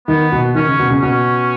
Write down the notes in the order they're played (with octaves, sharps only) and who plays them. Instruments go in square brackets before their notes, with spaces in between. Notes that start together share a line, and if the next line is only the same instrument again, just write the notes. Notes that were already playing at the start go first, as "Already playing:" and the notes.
[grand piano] D#3 [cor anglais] B3
[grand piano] B2
[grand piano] D#3 [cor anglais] C#4
[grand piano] C#3
B2
C#3
[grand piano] B2 [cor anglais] C#4